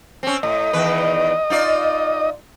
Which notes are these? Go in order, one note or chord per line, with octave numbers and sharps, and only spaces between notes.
C4 C#4
A2 D#5
E2 D#3 B4
D#4 F4 D5